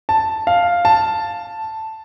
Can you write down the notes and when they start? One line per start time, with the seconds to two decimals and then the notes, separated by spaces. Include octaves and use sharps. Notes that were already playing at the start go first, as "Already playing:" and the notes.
0.09 A5
0.47 F5
0.85 A5